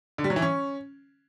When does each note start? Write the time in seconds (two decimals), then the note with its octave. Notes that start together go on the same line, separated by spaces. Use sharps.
0.18 D3
0.24 G3
0.30 F#3
0.36 E3
0.42 C#4